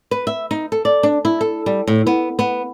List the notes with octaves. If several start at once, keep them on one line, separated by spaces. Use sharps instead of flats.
B4
E5
D#4
A4
D5
D4
E4
A4
G3
A2
B3
B3